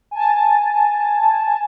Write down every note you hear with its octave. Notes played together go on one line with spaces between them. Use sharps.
G#5 A5